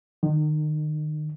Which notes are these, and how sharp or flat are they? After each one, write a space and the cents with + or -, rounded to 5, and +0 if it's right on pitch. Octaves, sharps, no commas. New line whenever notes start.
D#3 -35